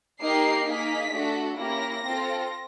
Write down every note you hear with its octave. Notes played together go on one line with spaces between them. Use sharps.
A#3 D#4 G4 C7
A#3 D#4 G#4 B6
A3 D4 F#4 A4
A#3 C#4 E4 G4 A#6
C4 F4 A4